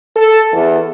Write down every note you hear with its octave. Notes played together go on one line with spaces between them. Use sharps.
A4
E2